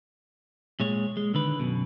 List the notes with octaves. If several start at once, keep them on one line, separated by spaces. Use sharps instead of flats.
A#2 G#3 C#5
G#3
D3 D#3 B4
F#2 B2